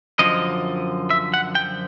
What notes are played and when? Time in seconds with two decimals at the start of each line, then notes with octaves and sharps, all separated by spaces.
0.19 F#2 D3 F3 D#5
1.10 E5
1.34 F#5
1.55 G5